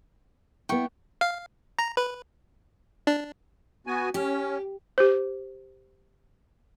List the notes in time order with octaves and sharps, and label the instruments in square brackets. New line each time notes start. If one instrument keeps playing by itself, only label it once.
[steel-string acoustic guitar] B3 E4 [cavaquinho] G5 C#6
[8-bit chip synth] F5
A#5
B4
D4
[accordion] B3 F#4 G#5
[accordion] C#4 [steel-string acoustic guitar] G4
[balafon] G4 C5